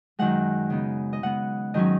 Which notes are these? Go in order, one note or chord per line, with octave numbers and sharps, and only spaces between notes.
F#2 D#3 G#3 F#5
C#3 B3 D#4
D#5
C#3 G#3 B3 F#5
G#2 D#3 F#3 C#4 D#5